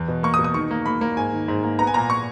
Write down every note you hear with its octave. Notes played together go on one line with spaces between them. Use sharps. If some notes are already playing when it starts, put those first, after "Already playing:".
Already playing: E2
B2
A#3 C#6
D#6
B2
D#6
D#3 C#6
A#3
A#3 B5
A#3
G#2 G#5
D#3
G#2
A#3
B3 A#5
G#5
A#2 A#5
A#2 C#6